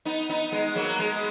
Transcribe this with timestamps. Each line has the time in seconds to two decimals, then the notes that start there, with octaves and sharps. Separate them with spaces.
0.05 B3 D#4
0.29 B3 D#4
0.52 G#3 B3
0.76 F#3 A#3
0.99 G#3 B3